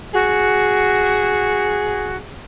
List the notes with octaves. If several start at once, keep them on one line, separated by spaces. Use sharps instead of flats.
F#4 G#4